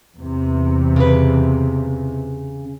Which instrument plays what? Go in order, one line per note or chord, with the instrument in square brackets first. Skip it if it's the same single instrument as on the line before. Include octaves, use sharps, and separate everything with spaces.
[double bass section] E2 C3
[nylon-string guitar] C#3 B4